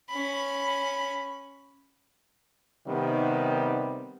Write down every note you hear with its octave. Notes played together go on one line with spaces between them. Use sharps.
C#4 B5
C3 D#3 G3 B3